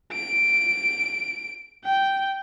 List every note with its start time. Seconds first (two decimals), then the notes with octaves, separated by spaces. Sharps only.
0.13 D7
1.84 G5